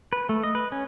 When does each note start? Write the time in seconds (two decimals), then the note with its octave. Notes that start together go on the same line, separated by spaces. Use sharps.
0.13 B4
0.29 A3
0.43 D#5
0.55 B4
0.72 C#4